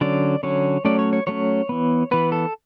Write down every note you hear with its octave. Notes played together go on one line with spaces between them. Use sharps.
D3 F#3 C#4 D5
D3 F#3 C#4 C#5
F#3 A3 C#4 D5
C#5
C#5
F#3 A3 C#4 C#5
E3 B3
E3 B3 B4
A4